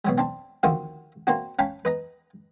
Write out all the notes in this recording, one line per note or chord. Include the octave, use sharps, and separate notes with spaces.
B2 F#3 G3
C4 D4 A5
D2 D#3 F3 C4 F#4 F5
A#3 C4 D4 F#4
C#4 F5 G5 A5 B5
B4 D#5 A#5